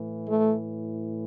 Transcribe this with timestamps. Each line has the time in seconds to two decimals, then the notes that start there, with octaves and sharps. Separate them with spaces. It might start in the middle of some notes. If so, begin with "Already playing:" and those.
Already playing: A2 E3
0.28 A3